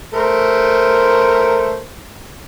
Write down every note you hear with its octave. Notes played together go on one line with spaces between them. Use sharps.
A3 A#4 C5